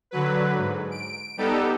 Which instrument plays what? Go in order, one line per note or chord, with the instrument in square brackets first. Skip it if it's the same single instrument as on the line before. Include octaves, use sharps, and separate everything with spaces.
[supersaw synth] D3 F#3 B4
G#2
D7
G3 B3 D#4 G4 A4